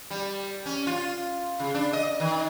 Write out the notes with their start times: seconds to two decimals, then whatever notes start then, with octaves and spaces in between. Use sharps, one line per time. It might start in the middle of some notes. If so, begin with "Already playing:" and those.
0.10 G3
0.66 C#4
0.87 F4
1.59 C#3
1.75 D4
1.93 D#5
2.20 D#3